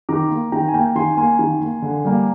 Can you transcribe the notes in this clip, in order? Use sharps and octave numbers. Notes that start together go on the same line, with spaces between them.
D#3 A#5 D6
A#3
D#3 G5 A#5
G#5
A#3 G5 A#5
D#3 G#5 C6
A#3 G#5 C6
D#3
A#3
D3
G3 A#3